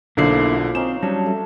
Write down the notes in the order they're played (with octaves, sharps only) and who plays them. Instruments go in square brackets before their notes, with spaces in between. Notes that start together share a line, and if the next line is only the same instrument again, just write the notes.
[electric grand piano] B1 D3 C7 [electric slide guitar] A#3 E4 [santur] F4 C5 D6
[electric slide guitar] C4 [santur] C#4 D#4 [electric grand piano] E7
[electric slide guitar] F#3 G3 C#4 [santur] D4
[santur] A3